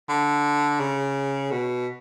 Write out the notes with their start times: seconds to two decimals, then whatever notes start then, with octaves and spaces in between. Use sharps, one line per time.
0.09 D3
0.80 C#3
1.51 B2